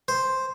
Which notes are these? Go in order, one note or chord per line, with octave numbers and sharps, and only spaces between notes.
C5